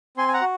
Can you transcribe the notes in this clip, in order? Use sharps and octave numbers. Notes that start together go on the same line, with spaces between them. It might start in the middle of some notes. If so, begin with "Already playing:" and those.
C4 G#5 C6
G#5
F#5 A#5
F#4